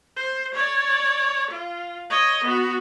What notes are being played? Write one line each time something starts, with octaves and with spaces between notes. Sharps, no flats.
C5
C#5 D5
F4
C#5 D#5
B3 F#4